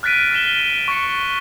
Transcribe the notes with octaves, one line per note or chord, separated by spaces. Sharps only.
F6 F#6 A6 B6 D7 D#7
F6 A6 B6 E7 G7
C#6 A6 C#7